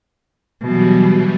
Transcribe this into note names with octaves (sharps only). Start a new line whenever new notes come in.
B2 E3 F#3 G3